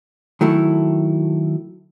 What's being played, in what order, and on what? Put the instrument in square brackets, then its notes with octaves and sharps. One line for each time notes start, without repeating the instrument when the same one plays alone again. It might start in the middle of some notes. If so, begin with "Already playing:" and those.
[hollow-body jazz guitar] D#3 F#3 A3 E4